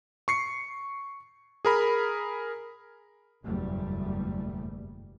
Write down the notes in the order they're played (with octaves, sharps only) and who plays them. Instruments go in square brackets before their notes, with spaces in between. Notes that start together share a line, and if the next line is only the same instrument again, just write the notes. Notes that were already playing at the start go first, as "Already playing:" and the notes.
[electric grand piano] C#6 C7 C#7
G#4 A#4 B5
[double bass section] F#1 E2 G2 B2 G3 A3